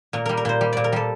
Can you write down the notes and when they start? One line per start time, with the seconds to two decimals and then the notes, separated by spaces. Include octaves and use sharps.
0.13 A#2 A#4
0.25 G3 A#4
0.37 A#4
0.45 A#2 C5
0.61 G3
0.73 A#2 D5
0.84 A#4
0.92 G3 A4